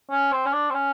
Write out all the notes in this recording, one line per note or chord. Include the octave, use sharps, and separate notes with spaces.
C#4
C4
C#4
D4
C4
C#4